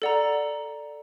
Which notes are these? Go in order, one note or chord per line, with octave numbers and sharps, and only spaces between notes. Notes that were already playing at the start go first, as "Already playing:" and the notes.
A4 D5 F#5 A#5